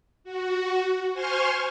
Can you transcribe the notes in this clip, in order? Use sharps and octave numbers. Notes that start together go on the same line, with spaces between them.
F#4
C5 G#5 C6 C#6 F6